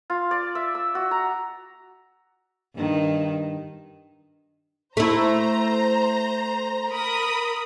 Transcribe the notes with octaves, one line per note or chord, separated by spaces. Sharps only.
F4
D5
E5
E6
F#4
A#5
G2 D#3
A3 E4 C5 A#5
A#4 B5 D#6